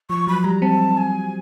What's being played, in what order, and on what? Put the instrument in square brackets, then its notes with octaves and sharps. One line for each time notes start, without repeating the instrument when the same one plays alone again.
[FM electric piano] F3 [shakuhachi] C#6
[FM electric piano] F#3 [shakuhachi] B5
[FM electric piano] G3 [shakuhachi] A#5
[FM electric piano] C4 [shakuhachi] A5
[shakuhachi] G#5